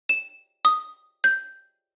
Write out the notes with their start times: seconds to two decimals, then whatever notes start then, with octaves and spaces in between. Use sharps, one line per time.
0.09 E7
0.65 D#6
1.24 G6